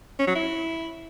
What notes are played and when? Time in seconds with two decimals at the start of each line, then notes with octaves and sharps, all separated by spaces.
0.19 C#4
0.27 F#3
0.35 E4